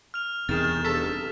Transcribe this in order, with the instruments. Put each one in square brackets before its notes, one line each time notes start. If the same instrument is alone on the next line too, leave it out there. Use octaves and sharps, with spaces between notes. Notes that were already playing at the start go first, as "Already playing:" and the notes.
[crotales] F6 F7
[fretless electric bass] E1 E2 C3 [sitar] D#3 [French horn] G#4 [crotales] A6 E7
[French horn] G2 [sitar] A4 [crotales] B6